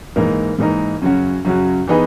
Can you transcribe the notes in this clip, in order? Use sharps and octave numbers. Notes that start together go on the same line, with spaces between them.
G#2 E3 A#3 D#4 A#4
G#2 E3 A#3 D#4 A#4
F#2 C#3 F#3 C#4 F#4
F#2 C#3 F#3 C#4 F#4
E3 B3 D#4 G#4 B4